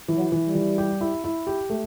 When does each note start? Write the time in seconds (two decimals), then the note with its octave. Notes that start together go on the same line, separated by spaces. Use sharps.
0.08 E3
0.16 F#3
0.32 E3
0.47 G3
0.55 E3
0.78 G4
1.01 E4
1.24 E4
1.47 G4
1.70 A3